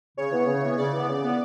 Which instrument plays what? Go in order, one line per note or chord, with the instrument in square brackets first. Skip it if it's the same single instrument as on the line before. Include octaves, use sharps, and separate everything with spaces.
[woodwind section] C#3 [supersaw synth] C#5
[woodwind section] E3 B3
C#3
E3 B3
[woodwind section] C#3 [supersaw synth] D5
[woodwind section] E3 B3
C#3
E3 B3